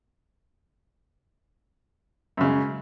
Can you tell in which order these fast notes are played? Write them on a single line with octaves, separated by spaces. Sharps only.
F#2 C#3 G#3